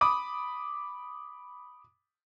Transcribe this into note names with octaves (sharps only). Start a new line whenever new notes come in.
B5 D6 D#6